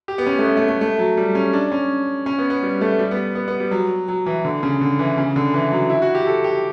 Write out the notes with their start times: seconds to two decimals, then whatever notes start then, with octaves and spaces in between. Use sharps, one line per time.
0.08 G4
0.18 B3
0.27 C#4
0.39 A3
0.44 B3
0.57 A3
0.69 A3
0.81 A3
0.99 F#3
1.17 G3
1.35 C#4
1.53 D4
1.72 C#4
2.26 C#4
2.38 B3
2.50 B3
2.63 G3
2.81 A3
2.99 G3
3.11 B3
3.35 B3
3.48 B3
3.60 G3
3.71 F#3
4.08 F#3
4.26 E3
4.45 D3
4.63 C#3
4.81 D3
4.99 E3
5.18 C#3
5.36 D3
5.54 E3
5.72 F#3
5.90 E4
6.02 F#4
6.15 G4
6.27 A4
6.44 G4